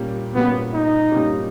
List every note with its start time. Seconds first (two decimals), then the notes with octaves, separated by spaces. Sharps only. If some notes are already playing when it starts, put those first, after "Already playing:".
Already playing: A#2 G3 A#3 C#4 G4
0.35 A#2 G3 A#3 B3 C#4 G4
0.73 D#4
1.12 A#2 G3 A#3 C#4 G4